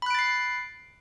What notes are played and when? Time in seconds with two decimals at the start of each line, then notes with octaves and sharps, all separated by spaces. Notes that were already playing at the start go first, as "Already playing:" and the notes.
0.02 B5
0.06 F#6
0.10 D7
0.15 A6
0.19 C7